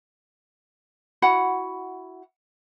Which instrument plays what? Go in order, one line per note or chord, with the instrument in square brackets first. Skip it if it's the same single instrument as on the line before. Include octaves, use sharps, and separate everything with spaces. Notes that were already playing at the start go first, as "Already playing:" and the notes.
[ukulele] E4 F#4 F#5 B5